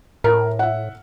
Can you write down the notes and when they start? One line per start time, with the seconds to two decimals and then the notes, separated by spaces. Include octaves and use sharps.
0.24 A2 A#4
0.59 E5 F#5